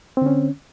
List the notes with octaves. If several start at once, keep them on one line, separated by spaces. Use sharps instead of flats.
D3 C4 C#4